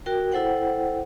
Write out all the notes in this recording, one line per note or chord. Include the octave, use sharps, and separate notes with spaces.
F#4 A#4 G5
E4 A4 C5 F#5 G5